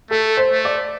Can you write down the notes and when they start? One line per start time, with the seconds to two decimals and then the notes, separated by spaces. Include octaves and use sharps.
0.11 A3 A4
0.37 C5
0.51 A3
0.65 D5